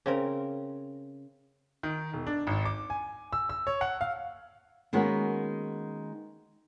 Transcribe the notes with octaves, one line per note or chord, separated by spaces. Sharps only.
C#3 C4 A#4
D#3
E1
D4
G#1
D6
G#5
E6
E6
C#5
F#5
F5
D#3 G#3 A#3 B3 C#4 F#4